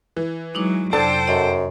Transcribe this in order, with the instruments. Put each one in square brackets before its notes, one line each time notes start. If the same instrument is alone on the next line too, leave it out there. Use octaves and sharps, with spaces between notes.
[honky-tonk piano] E3
[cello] F#3 G#3 [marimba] D#4 E4 D6
[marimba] F2 C3 F#3 [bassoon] D4 [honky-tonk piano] A4 A5 [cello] C5 G5
[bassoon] F#2 [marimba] D#5 F#5